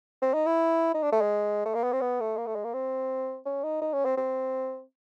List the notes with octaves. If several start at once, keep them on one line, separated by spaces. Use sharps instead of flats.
C4
D#4
E4
D#4
D4
A3
G#3
A3
A#3
B3
C4
B3
A3
A#3
A3
G#3
A#3
C4
C#4
D#4
D#4
C#4
C4
C4